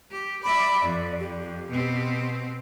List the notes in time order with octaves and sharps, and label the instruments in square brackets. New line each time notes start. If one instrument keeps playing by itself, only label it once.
[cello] G4
[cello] D5 E5 [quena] B5
[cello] F2 [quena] D5
[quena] G4
[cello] B2 C4